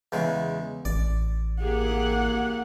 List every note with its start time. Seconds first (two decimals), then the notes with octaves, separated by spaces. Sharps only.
0.12 E2 C#3 G#3
0.85 A1 D5
1.62 A#3 G4 G#4 F#5